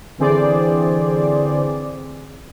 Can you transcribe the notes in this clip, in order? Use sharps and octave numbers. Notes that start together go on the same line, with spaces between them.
D3 E3 C4 G#4 C5 D5